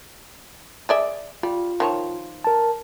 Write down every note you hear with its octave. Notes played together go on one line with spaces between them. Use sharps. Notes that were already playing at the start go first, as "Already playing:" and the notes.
G#4 D5 E5
G3 F4
D#3 F3 C#5
A#4 A5